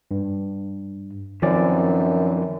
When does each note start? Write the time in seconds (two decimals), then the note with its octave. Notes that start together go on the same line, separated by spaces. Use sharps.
0.11 G2
1.42 F#2 D#3 F3 C4 C#4 D5